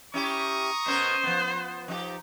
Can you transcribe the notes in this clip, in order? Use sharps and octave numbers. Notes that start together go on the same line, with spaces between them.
C#4 E4 G4 A#5 C#6 D#6
B2 C#4 A#4 C5
F3 B3
F3 D#4 G4